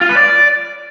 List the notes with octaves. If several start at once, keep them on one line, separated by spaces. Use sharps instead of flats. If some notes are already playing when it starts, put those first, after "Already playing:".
F4
B4
D5